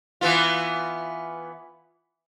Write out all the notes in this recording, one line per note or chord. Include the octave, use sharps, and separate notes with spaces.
E3 B3 F4